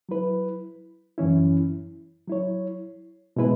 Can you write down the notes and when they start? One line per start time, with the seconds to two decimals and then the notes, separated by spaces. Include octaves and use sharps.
0.09 F#3 E4 B4
1.18 F#2 E3 C#4 E4
2.28 F#3 E4 C#5
3.36 B2 G#3 E4 B4